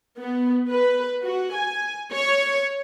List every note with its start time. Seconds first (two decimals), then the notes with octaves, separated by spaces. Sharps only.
0.19 B3
0.70 B4
1.24 F#4
1.56 G#5
2.12 C#5